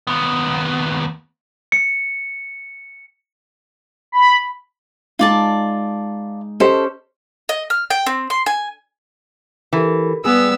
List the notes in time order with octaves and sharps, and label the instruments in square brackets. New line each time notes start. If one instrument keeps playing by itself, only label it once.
[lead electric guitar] D#2 B3
[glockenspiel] C#7
[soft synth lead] B5
[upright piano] G#3 D#4 [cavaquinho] F4 D5 A5
[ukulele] C#4 G4 C5 [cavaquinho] A4 [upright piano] D#5
[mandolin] D#5
F6
G5
C4
C6
G#5
[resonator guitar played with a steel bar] E3 [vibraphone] G4 A4 A#4
[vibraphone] G3 D5 [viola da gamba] B3 [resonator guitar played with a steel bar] G#4 [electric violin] E6